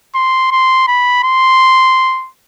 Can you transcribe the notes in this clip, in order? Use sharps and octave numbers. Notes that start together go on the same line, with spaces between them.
C6
C6
B5
C6